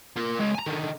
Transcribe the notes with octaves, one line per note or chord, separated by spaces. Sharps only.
F4 A#4
G#3 C#5
G#5 A#5
D3 D#3